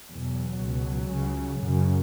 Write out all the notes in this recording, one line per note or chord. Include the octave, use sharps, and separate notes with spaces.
E2 B2 F#3
C#2 B2
C#2 C#3
F#2 C#3